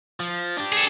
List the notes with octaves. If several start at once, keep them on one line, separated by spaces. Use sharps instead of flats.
F3
D4 G4
G#4 A4